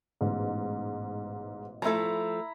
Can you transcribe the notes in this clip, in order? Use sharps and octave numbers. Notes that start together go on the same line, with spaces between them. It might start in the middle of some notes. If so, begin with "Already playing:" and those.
A1 G#2 B2
F3 A3 E4 A4 A#5